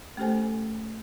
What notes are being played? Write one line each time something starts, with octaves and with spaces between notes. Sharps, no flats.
A3 C#4 G4 A4 C5 G#5